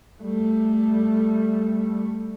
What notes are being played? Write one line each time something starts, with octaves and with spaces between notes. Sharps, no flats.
G3 A3